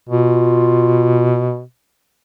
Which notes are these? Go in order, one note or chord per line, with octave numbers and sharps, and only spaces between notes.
B2 F4